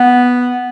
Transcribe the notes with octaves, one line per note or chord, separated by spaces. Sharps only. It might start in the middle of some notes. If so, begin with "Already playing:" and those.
Already playing: B3